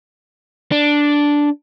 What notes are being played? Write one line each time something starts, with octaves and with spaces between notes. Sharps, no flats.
D4